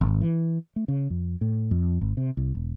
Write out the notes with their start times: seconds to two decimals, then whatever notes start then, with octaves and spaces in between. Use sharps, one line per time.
0.01 G#1
0.21 E3
0.76 A3
0.88 C#3
1.10 F2
1.41 A2
1.71 F2
2.01 G#1
2.17 C3
2.37 C2
2.55 E1